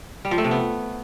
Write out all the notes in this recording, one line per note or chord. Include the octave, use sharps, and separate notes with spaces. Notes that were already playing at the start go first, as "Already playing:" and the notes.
G3
F3
A3
C3
B3